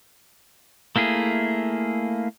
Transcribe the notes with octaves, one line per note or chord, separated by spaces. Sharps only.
A3 A#3 E4 G#4